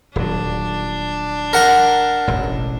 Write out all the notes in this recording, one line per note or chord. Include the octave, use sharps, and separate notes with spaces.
D#1 F#3 D4
A#4 F#5 A#5
E1 A1